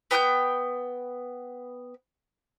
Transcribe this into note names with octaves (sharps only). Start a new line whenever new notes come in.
B3 G5 D6 G6